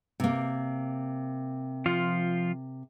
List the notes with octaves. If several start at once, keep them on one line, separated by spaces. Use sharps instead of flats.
C3 A#3
F3 F4